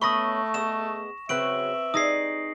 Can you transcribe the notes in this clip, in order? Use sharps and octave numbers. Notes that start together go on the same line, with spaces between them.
A3 B3 C#4 D#5 B5 C#6 D#6 A#6
B3 G#4 D#5 E7
C#3 F#3 C4 F#4 B4 E5 D7 F#7
G3 D#4 G#4 D#6 A#6 C7